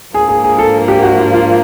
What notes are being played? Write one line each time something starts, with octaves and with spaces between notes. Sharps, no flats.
G#2 F3 A#3 D4 G#4
G#4
G#4
A4
G4
F#4
F4
F4